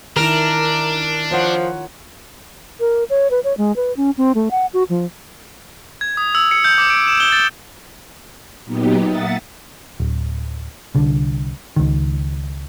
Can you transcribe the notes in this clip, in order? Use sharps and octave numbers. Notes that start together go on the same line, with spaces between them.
D#3 D4 E4 A#4
F3 F4 C#5 F#5
A#4
C#5
B4
C#5
G#3
B4
C#4
C4
A3
F#5
F#4
F3
G#6
D#6
E6
C#7
G6
D6
D7
E7
G7
A6
A#2 F#3 B3 D#4 G4
A#3 E5 F#5 D#6 A6
D1
C2 D3
C#2 D#3